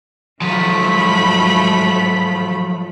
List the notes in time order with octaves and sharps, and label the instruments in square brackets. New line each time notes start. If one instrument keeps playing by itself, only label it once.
[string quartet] G#2 A3 B5 [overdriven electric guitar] F3 F#3